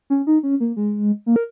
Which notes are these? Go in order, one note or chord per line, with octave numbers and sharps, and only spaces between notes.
C#4
D#4
C#4
A#3
G#3
A#3
A#4